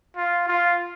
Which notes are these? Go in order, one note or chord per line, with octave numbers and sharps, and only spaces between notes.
F4
F4